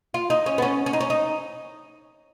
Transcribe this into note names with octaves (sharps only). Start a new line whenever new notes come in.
F4
D#4
C#4
B3
C#4
C#4
D#4
C#4
D#4